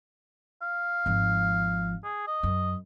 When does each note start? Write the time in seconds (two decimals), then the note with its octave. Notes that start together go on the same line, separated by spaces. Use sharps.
0.62 F5
1.06 G#1 F3
2.04 G#4
2.27 D#5
2.43 F#2